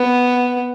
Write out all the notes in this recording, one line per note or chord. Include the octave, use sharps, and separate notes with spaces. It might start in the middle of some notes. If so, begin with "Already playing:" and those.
Already playing: B3